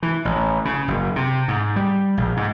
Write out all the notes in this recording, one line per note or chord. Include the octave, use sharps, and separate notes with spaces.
E3
A1
C#3
F#1
C3
G#2
G3
A#1
G#2